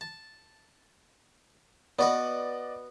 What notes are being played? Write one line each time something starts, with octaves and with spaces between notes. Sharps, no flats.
A5
B3 F#4 B4 D5 D#5